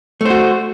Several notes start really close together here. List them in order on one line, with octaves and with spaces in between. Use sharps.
A3 C5 F#4